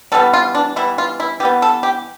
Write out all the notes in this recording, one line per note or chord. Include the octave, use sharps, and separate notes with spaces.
E3 G3 B3 A4
F4
D4
E3 G3 B3 E4
F4
E4
E3 G3 B3 G4
A4
G4